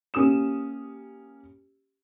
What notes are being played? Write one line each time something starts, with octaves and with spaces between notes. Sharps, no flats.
A#3 C#4 G4 D#6 E7